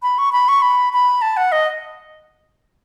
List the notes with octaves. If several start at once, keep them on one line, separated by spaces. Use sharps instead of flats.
B5
C#6
B5
C#6
B5
B5
A5
F#5
D#5